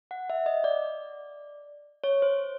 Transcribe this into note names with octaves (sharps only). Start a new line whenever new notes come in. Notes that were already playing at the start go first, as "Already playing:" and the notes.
F#5
E5
D#5
D5
C#5
C5